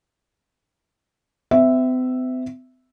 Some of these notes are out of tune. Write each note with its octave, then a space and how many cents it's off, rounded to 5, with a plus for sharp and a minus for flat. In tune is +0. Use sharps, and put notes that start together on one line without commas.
C4 -45 E5 +0